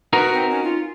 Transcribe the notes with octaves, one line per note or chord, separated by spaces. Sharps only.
D#4 F#4 A#4 B4
C4
C#4
F4